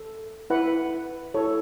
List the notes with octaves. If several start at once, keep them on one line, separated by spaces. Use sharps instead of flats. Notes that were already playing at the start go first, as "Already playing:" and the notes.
Already playing: A4
E4 B4 F#5
E4 A4 C#5